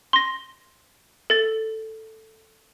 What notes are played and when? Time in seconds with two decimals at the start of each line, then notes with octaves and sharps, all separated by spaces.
0.13 C6 A#6
1.30 A4 A6